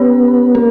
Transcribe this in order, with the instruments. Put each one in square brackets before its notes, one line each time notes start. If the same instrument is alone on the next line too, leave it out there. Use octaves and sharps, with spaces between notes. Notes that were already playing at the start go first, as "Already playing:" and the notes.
Already playing: [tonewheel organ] B3 [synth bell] C#4 G4 C#5
[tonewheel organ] A#3 [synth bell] C#4